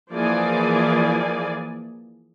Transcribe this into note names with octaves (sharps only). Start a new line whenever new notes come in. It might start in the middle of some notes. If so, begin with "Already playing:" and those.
E3 F3 A#3 G#4 D5 G#5